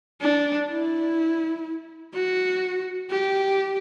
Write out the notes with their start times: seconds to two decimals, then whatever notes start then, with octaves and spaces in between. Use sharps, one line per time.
0.21 D4
0.70 E4
2.14 F#4
3.11 G4